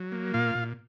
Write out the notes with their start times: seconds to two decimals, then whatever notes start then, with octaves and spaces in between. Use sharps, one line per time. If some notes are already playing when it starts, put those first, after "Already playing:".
Already playing: F#3
0.12 A#3
0.34 A#2 F4 F5
0.55 A#2